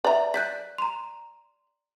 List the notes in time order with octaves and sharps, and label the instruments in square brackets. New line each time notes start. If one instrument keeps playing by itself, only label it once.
[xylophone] B4 E5 [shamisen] D5 A#5
[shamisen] D5 [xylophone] F#6 G6 B6
[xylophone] A#5 C6